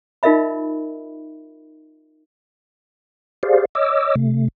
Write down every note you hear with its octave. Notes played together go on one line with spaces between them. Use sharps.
D#4 F4 A#4 D#5 E5 B5
G4 G#4 C5 D5 F5
C#5 D#5 D6 E6
C3 A3